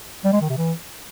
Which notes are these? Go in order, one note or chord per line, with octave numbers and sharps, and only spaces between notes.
G3
G#3
D#3
C3
E3